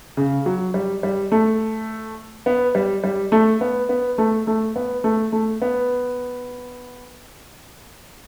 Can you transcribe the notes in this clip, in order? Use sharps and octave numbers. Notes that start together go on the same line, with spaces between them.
C#3
F#3
G3
G3
A3
B3
G3
G3
A3
B3
B3
A3
A3
B3
A3
A3
B3